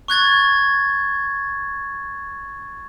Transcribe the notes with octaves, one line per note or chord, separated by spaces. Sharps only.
C#6 F#6 G#6 A6